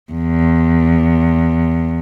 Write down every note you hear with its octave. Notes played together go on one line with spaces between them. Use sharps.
E2